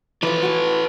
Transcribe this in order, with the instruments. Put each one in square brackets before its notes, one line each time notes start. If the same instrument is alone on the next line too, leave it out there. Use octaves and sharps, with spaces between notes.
[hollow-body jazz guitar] E3 F3 [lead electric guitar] A4 B4
[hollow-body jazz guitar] E3 F#4